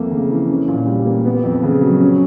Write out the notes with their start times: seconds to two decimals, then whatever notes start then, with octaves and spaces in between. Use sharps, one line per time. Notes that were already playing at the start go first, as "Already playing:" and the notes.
Already playing: F2 A3 A#3
0.11 C#3
0.30 E3
0.50 C#4
0.68 A#2
0.87 G3
1.06 A#3
1.25 B3
1.44 F2
1.63 C#3
1.82 F#3
2.01 C#4